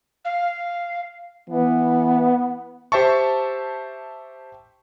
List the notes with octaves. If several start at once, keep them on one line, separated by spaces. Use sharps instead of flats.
F5
E3 B3
G4 C5 E5 A5 C#6